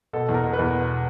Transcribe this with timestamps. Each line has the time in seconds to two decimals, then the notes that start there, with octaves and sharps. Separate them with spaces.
0.13 B2 A4
0.29 E2
0.34 A#4
0.44 B2
0.53 B4
0.59 E2
0.73 B2